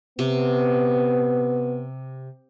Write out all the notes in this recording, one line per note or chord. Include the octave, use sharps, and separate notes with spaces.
C3 B3